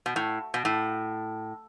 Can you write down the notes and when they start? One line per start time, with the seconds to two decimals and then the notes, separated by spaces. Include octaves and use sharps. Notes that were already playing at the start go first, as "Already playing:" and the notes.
0.06 B2
0.16 A2
0.54 B2
0.65 A2